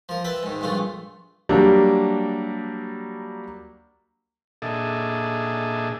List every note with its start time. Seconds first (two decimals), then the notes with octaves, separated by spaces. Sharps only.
0.09 F3 A#4
0.24 B4 E5 G5 A5
0.43 G#2 D#3
0.61 A#1 G2 A3 F4 G#4
1.49 F#3 G3 A#3 D4
4.62 A#2 D4 G#4 A4 D#5 E5